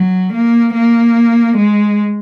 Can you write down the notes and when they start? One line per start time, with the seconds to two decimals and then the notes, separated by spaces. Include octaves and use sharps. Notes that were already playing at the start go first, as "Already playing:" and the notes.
Already playing: F#3
0.33 A#3
0.74 A#3
1.57 G#3